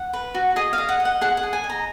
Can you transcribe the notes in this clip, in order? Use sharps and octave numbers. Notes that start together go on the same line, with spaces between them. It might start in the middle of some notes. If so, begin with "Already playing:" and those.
Already playing: F#5
B4
F#4
G#4 D#5
F5
D#5
F#5
D#5
F#5
G#4 F#5
F#5
G#4
G#5
D#5
A#5